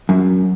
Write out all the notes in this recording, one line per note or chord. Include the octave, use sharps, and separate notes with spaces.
F#2